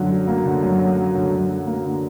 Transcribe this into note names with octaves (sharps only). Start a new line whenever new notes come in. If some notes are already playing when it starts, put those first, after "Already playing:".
Already playing: F#2 D3
F#3
A#3
D3
F#2
F#3
A#3
D3
F#2
F#3
A#3
D3